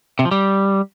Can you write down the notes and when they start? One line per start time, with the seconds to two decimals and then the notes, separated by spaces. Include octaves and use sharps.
0.19 C3
0.25 F3
0.31 G3